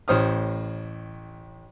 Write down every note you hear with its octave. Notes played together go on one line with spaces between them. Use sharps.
A1 A2 C5 D#6 F6